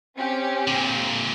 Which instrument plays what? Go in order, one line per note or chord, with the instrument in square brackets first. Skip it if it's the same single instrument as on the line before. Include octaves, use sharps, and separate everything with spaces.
[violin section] C4 C#4 G4
[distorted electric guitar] A#2 D3